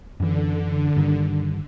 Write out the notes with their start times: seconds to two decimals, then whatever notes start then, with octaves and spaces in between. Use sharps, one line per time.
0.20 F#2 D3 E3
0.96 G2 D#3